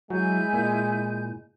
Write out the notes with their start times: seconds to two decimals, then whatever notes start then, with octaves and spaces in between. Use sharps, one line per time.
0.10 F#3 G#3 E4 G#5 G6
0.53 A#2